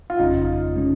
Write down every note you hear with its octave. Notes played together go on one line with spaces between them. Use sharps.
F4
G1 F2 C#3 G#3 C#4 D#4
C#3 G#3 C#4